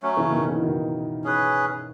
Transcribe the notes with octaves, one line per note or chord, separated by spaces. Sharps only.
F#3 A3 C#4
C#3 E3
B2 D#3
C#3 E3
D#3 F#3
C#4 G#4 B4